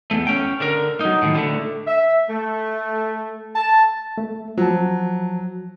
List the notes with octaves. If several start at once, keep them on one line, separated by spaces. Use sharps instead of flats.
E2 A3
C#4 G5
D3 A#4
F#3 D#4
A2 D#3
D3 A3
E5
A3
A5
A3
F3 F#3 A5